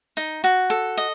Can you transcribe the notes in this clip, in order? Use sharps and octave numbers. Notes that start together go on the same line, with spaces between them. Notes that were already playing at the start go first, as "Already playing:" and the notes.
D#4
F#4
A4
D#5